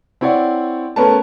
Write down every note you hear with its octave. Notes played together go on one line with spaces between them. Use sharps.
C4 E4 C#5 D5 F#5
A3 B3 C#4 A#4 B4 A5